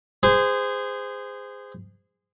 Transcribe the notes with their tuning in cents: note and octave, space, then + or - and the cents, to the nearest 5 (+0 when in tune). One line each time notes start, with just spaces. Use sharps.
G#4 -20 C5 -25